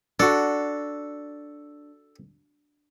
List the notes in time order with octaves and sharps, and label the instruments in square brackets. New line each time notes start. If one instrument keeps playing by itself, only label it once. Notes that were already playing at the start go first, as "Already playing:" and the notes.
[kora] D4 F#4 [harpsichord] A4